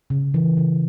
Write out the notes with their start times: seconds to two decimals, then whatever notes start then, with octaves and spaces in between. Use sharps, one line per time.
0.10 C#3
0.34 E3
0.57 C#3